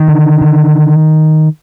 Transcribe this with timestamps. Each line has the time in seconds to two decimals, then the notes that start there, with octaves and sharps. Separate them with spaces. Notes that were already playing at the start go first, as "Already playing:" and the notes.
Already playing: D#3
0.08 D3
0.41 D3